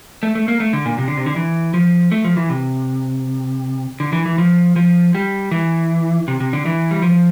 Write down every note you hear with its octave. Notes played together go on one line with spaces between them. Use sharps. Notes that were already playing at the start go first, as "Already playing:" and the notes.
A3
A3
A#3
A3
D3
A#2
C3
D3
C3
D3
E3
F3
A3
F3
E3
C3
D3
E3
E3
F3
F3
G3
E3
C3
C3
D3
E3
G3
F3